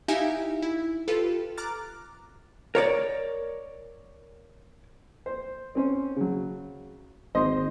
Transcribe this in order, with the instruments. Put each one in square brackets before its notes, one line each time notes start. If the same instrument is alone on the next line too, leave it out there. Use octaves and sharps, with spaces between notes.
[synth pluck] D#4 E4 G4 E5 F5 G#5
E4
F4 G4 A4 B4
A#5 D6 F6 F#6 A6
[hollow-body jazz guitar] A#4 C#5 D5
[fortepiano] C5
C4 C#4 C5
C#3 F#3
[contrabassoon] G#1 [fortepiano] C5 D#5 C6